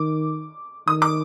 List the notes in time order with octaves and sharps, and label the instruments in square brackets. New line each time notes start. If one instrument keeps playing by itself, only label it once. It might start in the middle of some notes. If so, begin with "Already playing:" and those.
Already playing: [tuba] D#3 [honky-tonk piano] D6
[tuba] D#3 [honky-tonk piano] D#6
[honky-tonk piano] D6